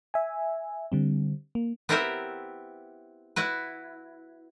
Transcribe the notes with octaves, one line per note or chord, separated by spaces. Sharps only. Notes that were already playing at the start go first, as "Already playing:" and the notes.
E5 G#5
D3 G3 C4
A#3
B3 C4 E4 G4 A#4 E5
E4 F#4 B4